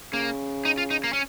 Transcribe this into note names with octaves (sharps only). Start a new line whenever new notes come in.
C#3 A#3
D#4
F4
D#4
A#3
C#4